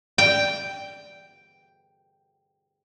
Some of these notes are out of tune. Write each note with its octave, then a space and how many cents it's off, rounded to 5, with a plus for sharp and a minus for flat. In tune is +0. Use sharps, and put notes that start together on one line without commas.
G5 +0